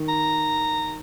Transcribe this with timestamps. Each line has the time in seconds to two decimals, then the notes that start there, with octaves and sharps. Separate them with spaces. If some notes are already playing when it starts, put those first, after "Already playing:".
Already playing: D#3
0.09 A#5